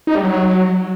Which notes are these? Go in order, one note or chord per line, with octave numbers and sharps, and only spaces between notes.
D#4
G3
F#3